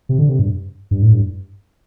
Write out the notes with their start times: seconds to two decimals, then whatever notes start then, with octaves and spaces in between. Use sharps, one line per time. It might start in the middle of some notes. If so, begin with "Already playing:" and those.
0.09 C3
0.19 D3
0.29 C3
0.39 G2
0.91 G2
1.02 A2
1.12 G2